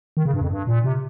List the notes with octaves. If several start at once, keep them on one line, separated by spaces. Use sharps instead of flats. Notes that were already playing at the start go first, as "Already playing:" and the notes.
D#3
C#3
G2
F2
G2
A#2
C3